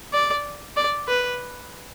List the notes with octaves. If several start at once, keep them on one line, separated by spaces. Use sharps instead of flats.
D5
D5
B4